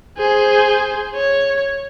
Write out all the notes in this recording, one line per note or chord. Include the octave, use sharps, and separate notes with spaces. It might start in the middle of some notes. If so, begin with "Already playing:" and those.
G#4 C5
C#5